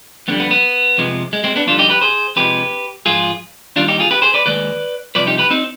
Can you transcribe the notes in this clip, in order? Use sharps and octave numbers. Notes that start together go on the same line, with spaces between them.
F2 D3 G3 B3
B3
B3
F2 C3 F3 G#3
G#3
G#3 C4
B3 D4
F2 D3 G3 D4 F4
D#4 G4
G4 B4
G#4 C5
F2 C3 F3 G#3 G4 B4
G#2 F3 G#3 F4 G#4
D#2 D#3 G3 D4 F4
D#4 G4
F4 G#4
G4 B4
G#4 C5
B4 D5
D#2 D#3 G#3 B4 D5
C2 C3 F3 B4 D5
D#4 G4
G4 B4
C4 D#4